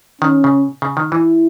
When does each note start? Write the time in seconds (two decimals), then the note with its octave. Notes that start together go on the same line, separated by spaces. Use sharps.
0.21 D#3 C#4
0.44 C#3
0.82 C#3
0.97 D#3
1.12 E3 E4